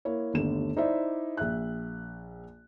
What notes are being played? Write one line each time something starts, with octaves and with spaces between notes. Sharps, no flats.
A#3 E4 C#5
G1 D#2 D3 A3 E7
D#4 E4 C5 D5 E5
A#1 E5 F#6